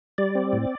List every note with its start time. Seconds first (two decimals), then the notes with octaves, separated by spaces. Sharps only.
0.18 G3 D5
0.35 C4
0.53 A2